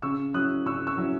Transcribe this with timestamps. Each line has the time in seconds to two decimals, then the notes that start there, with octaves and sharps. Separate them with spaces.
0.02 C#3 C#6 E6
0.34 F#3 C#4 E4 D#6 F#6
0.66 C#3 C#6 E6
0.87 C#6 E6
0.97 F#3 C#4 E4